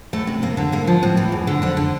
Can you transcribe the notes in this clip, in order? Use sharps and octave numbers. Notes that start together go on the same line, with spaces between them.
E2 A3
C3
F2 A#3
D3
G2 A#3
F3
A2 C4
E3
E2
D3
F2 D4
D3